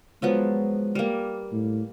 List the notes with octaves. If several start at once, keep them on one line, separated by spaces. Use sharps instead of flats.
F3 F#3 G#3 B3
G3 A#3
A2